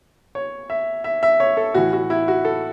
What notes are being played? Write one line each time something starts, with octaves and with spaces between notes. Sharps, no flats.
C#5
E5
E5
E5
C#5
A4
A2 E3 F#4
F#4
E4
F#4
A4